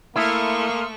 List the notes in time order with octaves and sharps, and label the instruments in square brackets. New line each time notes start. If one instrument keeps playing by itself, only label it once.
[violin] A3 C#6 [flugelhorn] A#3 [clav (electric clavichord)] E4 [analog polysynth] C6 D#6 F6